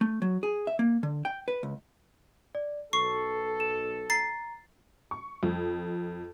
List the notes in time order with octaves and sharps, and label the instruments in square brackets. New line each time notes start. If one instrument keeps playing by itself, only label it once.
[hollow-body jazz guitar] A3
F#3
G#4
E5
A#3
D3
G5
B4
C#2
[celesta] D5
[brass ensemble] B1 A4 [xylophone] C#6 [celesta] C7
[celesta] E7
[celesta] A#5 [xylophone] A6 C7
[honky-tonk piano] C#6
F2